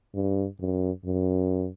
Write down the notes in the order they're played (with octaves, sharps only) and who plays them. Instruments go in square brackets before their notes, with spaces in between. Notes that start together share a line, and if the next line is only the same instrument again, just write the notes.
[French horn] G2
F#2
F#2